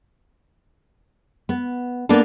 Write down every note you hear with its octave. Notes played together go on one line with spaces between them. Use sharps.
B3
A#3 B3 D4 A4